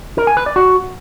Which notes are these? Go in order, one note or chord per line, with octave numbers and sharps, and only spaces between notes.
A#4
G#5
B4
D5
F#4